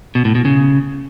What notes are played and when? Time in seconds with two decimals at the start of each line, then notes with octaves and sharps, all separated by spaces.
0.15 B2
0.25 A2
0.35 B2
0.45 C#3